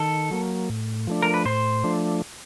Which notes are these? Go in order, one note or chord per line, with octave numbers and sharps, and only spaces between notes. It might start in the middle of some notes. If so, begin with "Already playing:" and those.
Already playing: D#3 A4
F#3 A#3
A2
F3 A3 D4
A#4
B4
A2 C5
F3 A3 D4